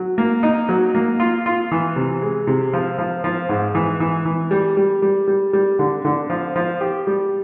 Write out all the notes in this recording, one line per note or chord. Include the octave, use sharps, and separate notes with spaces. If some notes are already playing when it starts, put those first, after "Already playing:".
Already playing: F#3
A#3
D#4
F#3
A#3
F4
F4
E3
C3
G#3
C3
F3
F3
F3
G#2
E3
E3
E3
G3
G3
G3
G3
G3
D3
D3
F3
F3
G4
G3